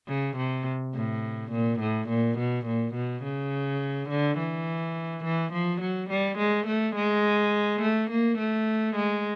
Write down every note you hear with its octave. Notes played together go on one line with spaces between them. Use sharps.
C#3
C3
A2
A#2
A2
A#2
B2
A#2
B2
C#3
D3
E3
E3
F3
F#3
G3
G#3
A3
G#3
A3
A#3
A3
G#3